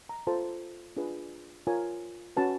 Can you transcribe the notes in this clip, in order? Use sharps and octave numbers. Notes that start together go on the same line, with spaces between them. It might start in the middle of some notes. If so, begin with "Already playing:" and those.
A#5
F4 A4 C5 A5
D4 F4 G#4 B4
F4 A#4 C#5 G#5
C#4 F#4 B4 A5